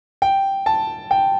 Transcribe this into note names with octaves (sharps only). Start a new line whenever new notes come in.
G5
A5
G5